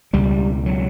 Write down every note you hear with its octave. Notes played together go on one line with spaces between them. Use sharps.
C#2 B2 G3
F#3